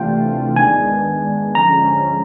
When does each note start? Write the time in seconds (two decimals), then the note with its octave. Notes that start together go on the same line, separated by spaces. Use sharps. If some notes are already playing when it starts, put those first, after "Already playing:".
Already playing: C3 E3 A3 D4 F4 G5
0.56 D#3 G#3 B3 D4 G#5
1.55 D3 F3 G#3 C#4 A#5